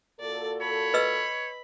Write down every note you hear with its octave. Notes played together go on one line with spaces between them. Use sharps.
A#2 F#4 A4 D5
C#5 B5
B4 D#5 E6